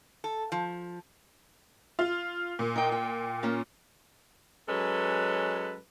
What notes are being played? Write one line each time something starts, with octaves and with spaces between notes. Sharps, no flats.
A4
F3
F4
A#2
D#4 G5
G5
A#3 C#4 F4
F#3 G#3 C#4 A4 B4